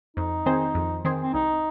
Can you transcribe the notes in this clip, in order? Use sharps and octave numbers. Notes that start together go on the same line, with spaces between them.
F2 D#4
D#3 C4 G#4 C5
F2
D#3 C4 G#4 C5
C4
C2 D#4